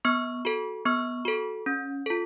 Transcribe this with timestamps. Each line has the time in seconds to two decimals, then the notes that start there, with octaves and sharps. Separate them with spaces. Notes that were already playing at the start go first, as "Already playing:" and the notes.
0.05 B3 C#6 F6
0.45 F#4 A4
0.85 B3 C#6 F6
1.25 F#4 A4
1.66 C#4
2.06 F4 A4